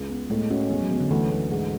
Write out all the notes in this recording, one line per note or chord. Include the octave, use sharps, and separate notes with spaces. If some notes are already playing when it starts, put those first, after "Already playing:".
Already playing: C#2
B3
A2 G#3
C#4 F#4
C#4
E2 A3
F#3
E2
D3
D2 E3
D2
G#2